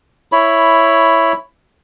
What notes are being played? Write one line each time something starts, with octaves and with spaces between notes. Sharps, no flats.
E4 C#5 B5